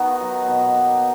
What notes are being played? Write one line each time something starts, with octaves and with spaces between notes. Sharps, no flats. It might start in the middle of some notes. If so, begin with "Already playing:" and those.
Already playing: D#3 B3 D#4 F#4
F#3
B2
A#3